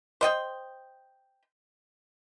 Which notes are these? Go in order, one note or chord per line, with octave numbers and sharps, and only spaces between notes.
C5 D#5 G5